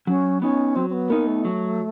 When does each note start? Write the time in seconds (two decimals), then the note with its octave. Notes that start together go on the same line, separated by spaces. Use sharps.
0.07 F#3 C#4
0.42 B3 C#4 D#4
0.75 F#3 C4
0.90 C4
0.93 B3
1.10 A#3 B3 D#4
1.27 A3
1.45 F#3